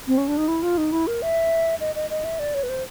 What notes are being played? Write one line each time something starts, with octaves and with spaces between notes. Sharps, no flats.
C4
C#4
D4
D#4
E4
F4
D#4
E4
A#4
E5
D#5
D#5
D#5
E5
D5
C#5
B4
C5